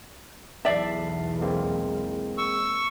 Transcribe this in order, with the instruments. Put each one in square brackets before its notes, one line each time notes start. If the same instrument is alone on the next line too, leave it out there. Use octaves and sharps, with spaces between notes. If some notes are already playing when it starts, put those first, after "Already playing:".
[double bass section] B1 E2 [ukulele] D5 E5 [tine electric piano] A5 C7
[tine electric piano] G#3 A#3 C4
[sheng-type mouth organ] C#6 E6